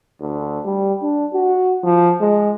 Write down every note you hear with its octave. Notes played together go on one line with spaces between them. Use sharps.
D2
G3
D4
F#4
F3
G#3